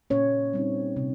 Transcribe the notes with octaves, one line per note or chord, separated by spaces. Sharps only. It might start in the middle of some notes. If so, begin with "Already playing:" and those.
A#2 C#4 C#5
G3 C4 D#4
C3